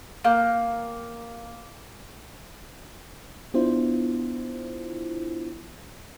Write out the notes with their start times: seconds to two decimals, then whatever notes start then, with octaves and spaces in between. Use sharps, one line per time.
0.24 A#3 G5
3.54 B3 D4 E4 F4 C5